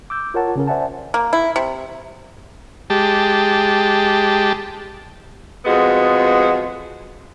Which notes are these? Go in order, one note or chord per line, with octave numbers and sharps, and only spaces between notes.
D6 E6 G6
F4 A#4 C#5 F#5 A5
C#3 C#4 A#4
C5 D5 E5 F#5 G#5 A5
A#3
E4
C3
G#3 G4 A5
F2 G#3 B3 F#4